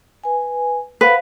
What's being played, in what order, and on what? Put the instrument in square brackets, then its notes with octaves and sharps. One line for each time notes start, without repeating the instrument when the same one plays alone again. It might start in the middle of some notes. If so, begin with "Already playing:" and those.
[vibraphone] B4 G#5
[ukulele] B4 [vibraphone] C5 F5 F#5